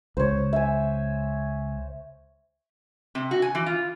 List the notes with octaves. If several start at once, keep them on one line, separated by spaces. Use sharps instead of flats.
C#2 C5 C#5
E5 G#5
C3
F#4
G#5
E3
F4